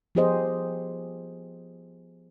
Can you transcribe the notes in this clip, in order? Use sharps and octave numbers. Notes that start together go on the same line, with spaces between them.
F3 B3 G4 G#4 C5 D#5